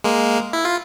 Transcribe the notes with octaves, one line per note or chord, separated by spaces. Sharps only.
G#3 A#3
E4
F4